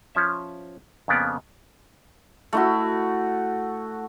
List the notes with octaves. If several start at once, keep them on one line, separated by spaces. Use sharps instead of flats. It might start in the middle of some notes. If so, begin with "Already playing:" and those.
F3 C#4 E5
F2 C#3 A#3 B3 D5
A3 E4 F#4